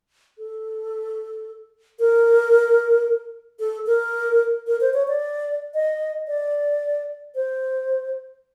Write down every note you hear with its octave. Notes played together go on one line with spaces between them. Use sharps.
A4
A#4
A4
A#4
A#4
C5
C#5
D5
D#5
D5
C5